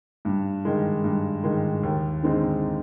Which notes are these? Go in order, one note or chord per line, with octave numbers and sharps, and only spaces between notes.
G2
D#3 G#3
G2
D#3 G#3
D#2
D3 G#3 C4 D#4